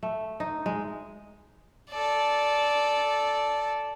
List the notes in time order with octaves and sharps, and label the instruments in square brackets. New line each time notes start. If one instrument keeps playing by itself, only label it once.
[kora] A3
D#4
G#3
[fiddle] A4 D5